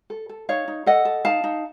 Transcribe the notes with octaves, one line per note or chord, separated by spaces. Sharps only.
A4
A4
D#4 C#5 F5
D#4
A4 D#5 F#5
A4
D#4 F5 A5
D#4